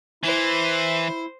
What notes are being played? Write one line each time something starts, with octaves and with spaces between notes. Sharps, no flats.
E3 E4 C5